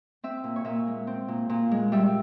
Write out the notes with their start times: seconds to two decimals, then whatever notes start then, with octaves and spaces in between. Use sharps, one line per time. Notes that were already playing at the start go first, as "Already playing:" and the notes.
0.24 C4 E5
0.44 A#2
0.56 C#5
0.65 A#2 E5
0.87 G#3
1.07 C4
1.28 A#2
1.49 A#2
1.71 G#3
1.92 G3 E5